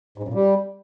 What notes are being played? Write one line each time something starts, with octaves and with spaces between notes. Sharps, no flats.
G#2
F#2
A#2
G3